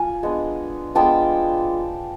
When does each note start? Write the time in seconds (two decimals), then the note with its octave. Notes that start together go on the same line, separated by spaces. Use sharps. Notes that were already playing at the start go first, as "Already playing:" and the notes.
Already playing: A#3 F4 G#5
0.23 G#3 B3 D4
0.95 G#3 B3 D4 F4 G5 A5